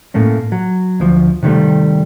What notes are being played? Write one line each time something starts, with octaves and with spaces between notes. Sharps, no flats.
A2 A3 A#3 C#4
F#3
D2 F3
C3 D#3 G3 A3